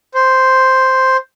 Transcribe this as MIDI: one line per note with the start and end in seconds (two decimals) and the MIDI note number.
0.14 1.17 72